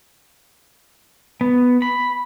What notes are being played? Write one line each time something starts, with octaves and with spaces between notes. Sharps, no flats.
B3
B5